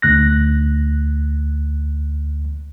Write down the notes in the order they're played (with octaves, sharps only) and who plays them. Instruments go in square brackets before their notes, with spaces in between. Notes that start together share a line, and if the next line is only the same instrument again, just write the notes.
[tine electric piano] D2 F#6 A#6